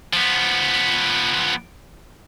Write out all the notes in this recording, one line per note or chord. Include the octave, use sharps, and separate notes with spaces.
F3 B3